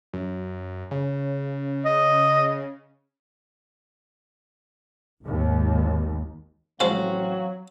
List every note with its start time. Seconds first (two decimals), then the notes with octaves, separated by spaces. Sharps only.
0.13 F#2
0.91 C#3
1.85 D#5
5.22 G#1 D#2
6.80 A1 F3 F#3 G#3 C4 F#4 F5